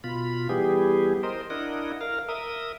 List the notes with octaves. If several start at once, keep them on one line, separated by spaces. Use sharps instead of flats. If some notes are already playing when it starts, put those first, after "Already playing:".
B2 F4 B5
E3 G3 B3 G4 G#4
A#4 C5 D#5
D4 E4 A#4 D#5 F#5
A#4 F5
A#4 E5 D#6